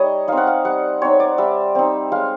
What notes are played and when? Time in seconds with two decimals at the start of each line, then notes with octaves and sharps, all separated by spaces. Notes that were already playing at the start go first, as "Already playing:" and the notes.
Already playing: G3 D#4 C#5 D#5
0.28 C4 D#4 F5
0.37 F#5
0.47 F5
0.65 G3 F#5
1.01 C4 D#4 C#5
1.20 D5
1.38 G3 E5
1.75 C4 D#4
2.12 G#3 F5